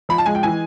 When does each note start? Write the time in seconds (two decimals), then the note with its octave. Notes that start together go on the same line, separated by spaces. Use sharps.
0.09 F3 B5
0.18 A5
0.26 G#3 G#5
0.35 G5
0.43 E3 G#5